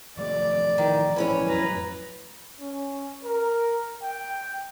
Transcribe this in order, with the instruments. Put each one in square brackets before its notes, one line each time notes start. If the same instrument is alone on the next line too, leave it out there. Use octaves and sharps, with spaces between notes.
[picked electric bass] A1 F3 A3 [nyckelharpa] D5
[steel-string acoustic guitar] D#3
E3 C#4 C#5
[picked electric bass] F2 A2 F#3 [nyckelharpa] B4 A#5
[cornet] C#4
A#4
G5